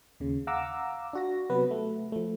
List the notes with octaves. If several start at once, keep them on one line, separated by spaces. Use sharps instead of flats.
D#2 C#3
F5 F#5 A#5 D6 E6
D4 F#4 A#6
C3 F#3 B3 B4
A3
F3 A3